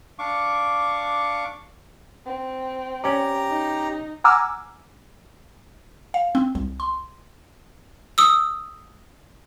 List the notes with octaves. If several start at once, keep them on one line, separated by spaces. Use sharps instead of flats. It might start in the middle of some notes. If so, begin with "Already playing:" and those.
D4 F5 C#6 D6
C4
C#4 G4 D5 A#5
D#4
F#5 G#5 A#5 D6 E6 F6
F5
C4
C2
C6
D#6 E6